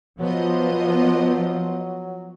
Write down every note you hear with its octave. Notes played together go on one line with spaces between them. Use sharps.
F3 F#3 B3 D#5